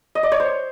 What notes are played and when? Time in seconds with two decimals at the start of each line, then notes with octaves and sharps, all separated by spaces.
0.15 D#5
0.23 D5
0.32 C#5
0.40 C5